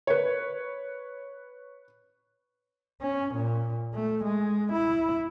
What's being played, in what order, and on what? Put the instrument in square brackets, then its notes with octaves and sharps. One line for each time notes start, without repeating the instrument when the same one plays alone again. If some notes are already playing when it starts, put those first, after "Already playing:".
[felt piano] B4 C#5
[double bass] C#4
A#2
A3
G#3
E4